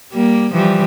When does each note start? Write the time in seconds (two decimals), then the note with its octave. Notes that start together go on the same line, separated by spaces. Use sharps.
0.12 G3 A#3
0.53 E3 F3 G3